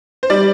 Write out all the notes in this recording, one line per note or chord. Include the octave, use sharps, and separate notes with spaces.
C5
G3 D5